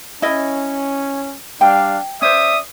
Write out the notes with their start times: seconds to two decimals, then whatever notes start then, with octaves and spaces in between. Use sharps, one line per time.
0.22 C#4 E4 D#5
1.61 G3 D4 F5 G5
2.22 C#4 C5 D5 E5 D#6